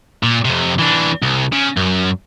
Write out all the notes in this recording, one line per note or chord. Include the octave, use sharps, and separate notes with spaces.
A#2
F2 C3
E3 D4
C2
C#3
F#2